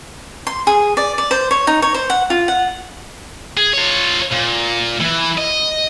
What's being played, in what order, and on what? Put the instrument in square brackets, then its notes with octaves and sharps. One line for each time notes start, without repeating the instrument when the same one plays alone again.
[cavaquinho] C6
G#4
D5
D5
C5
C#5
D#4
C#5
C5
F#5
F4
F#5
[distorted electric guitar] G#4
F4 C#5
A#2
E3 E4
D#5